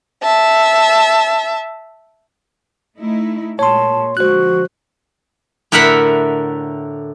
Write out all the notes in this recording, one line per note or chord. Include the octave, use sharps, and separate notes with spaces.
E5 A5
A3 D#4 E4
A#2 G#3 C#5 A5 C6
D3 F3 G#3 F#4 C5 F#6
A2 D3 A#4 E5 F#5 B5